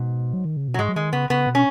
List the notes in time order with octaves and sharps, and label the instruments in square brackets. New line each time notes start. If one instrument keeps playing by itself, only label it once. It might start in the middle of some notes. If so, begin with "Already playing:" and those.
Already playing: [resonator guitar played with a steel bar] G#2 [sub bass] B2
[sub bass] F#3
D#3
C#3
B2
[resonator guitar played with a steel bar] F#3
[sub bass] G#2 [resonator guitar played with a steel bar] G#3
[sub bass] F#3
[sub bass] D#3 [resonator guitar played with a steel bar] G#3
[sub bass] C#3 [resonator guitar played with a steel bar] B3
[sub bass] C#3 [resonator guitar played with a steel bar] B3
[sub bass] B2
[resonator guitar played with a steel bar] C#4